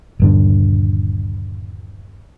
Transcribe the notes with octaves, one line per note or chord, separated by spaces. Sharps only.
D#1 G2 D3